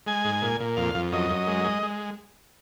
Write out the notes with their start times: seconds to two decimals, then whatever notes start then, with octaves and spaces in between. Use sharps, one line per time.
0.07 G#3 G#5
0.25 G#2
0.42 A#2
0.60 A#2
0.77 F2 F5
0.95 F2
1.12 F#2 D#5
1.30 F#2
1.48 G#3
1.64 G#3
1.83 G#3